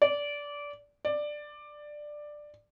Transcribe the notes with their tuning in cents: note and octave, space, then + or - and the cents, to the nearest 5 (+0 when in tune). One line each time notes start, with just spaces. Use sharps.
D5 -20
D5 +10